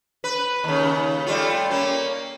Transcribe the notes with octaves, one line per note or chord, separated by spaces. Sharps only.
B4
D#2 C#3
G3 A3 F4
A#3 C#4